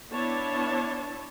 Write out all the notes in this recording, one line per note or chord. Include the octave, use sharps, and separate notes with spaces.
B3 D4 E4 C#5 A5